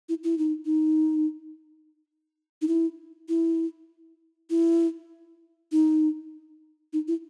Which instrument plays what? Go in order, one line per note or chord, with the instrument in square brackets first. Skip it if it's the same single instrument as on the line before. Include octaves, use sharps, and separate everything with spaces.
[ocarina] E4
E4
D#4
D#4
D#4
E4
E4
E4
D#4
D#4
E4